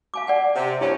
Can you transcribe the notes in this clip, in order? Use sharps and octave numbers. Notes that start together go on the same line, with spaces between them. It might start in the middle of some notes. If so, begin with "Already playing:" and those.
F5 G#5 D6
D5 F#5 G#5
C3
G2 C#4 E4 G#5